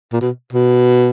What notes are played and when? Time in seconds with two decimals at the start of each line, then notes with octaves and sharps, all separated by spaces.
0.13 A#2
0.21 B2
0.53 B2